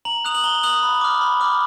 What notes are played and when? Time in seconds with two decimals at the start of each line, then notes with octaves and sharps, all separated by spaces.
0.05 A#5 F#7
0.25 D#6 F#6 F7
0.35 F#7
0.44 A#5 G7
0.63 D#6 F#6 F#7
0.83 B5
1.01 D6 F6
1.21 B5
1.41 D6 F6